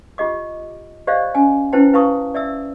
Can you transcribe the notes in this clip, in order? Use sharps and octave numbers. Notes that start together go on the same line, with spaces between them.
F4 G4 D#5 D6
G4 C5 D5 D#5 F5
C#4 G#5
C#4 E4 B4 C5 G5 A5
E4 B4 F5 A5 C#6 D#6
D5 E5 E6